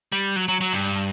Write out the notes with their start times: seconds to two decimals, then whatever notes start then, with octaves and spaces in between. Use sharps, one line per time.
0.12 G3
0.36 F#3
0.48 F#3
0.61 F#3
0.73 G2